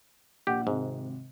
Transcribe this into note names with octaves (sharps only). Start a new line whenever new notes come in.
A#1 G4 F#5
G#1 G#2 C3